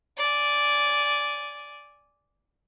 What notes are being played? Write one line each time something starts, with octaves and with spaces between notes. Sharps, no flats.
D5 G#5